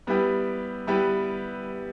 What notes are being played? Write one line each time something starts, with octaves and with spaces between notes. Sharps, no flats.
G3 B3 E4 G4 B4
G3 B3 E4 G4 B4